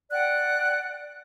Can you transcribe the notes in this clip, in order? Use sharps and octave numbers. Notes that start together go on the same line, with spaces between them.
D5 F#5 G5 F#6